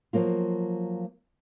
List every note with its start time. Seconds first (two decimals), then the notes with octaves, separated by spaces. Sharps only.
0.13 F3 F#3 A#3 F4